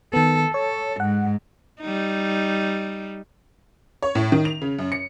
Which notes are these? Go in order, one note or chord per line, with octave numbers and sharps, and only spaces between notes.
D#3 B3 A4
A4 C#5
G#2 F#5
G3 D#4
C#5
A2
D#3
F7
C#3
F#2
C#7